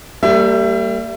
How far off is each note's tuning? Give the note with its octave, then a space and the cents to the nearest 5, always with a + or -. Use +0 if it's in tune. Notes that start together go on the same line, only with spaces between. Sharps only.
G3 +0 A#3 -35 E5 +30